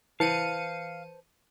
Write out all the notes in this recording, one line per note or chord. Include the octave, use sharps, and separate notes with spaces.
E3 B4 C5 F5 A5 C#7 D#7